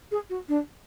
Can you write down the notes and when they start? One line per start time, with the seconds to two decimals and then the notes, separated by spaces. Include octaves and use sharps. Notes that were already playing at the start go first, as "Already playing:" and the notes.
0.11 G#4
0.29 F#4
0.48 D4